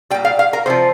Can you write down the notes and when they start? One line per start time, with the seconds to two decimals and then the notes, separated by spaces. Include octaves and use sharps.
0.10 G3 G5
0.14 A#2
0.25 F5
0.39 F5
0.53 A#4
0.66 C3 F3 C5